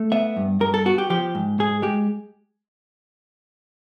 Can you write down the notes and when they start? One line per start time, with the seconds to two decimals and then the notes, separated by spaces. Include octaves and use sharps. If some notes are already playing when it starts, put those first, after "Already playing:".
Already playing: A3
0.12 B3 E5
0.36 G2
0.60 G2 A#4
0.74 A4
0.85 B3 F#4
0.98 G4
1.10 F3 G4
1.35 G#2
1.59 G#2 G#4
1.82 G#3 G4